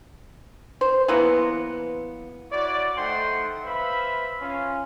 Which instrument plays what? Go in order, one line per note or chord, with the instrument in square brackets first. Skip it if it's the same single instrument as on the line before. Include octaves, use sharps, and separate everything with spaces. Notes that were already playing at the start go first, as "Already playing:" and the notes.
[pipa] C5
E3 F#3 A#3 B3
[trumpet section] E4 F#4 C#5 D5
A3 D#4 C5 F#5 G5 C6
B4 C5 E5 F5 B5
C#4 F4 F5